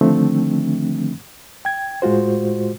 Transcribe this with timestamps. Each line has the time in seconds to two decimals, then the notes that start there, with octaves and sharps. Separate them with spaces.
0.01 D3 D#3 F3 A3 C4 D4
1.65 G5 G#6
2.02 A2 G#3 F4 F#4 C5